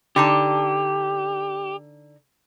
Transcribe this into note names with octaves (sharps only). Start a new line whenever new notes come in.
D3 D#4 G4 A5